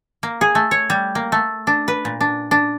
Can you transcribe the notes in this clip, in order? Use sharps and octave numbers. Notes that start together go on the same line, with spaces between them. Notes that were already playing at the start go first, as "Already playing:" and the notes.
A#3
G#4
A3
C#5
G3
A#3
A3
D4
B4
A#2
D4
D4